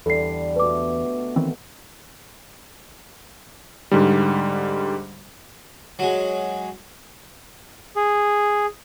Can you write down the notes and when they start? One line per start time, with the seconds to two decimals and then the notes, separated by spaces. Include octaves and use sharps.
0.06 E2 D3 G3 A4 C7
0.56 B2 A3 B4 D6
1.36 D#3 E3 C4
3.91 G#2 D3 G3
5.99 F#3 G#3
7.96 G#4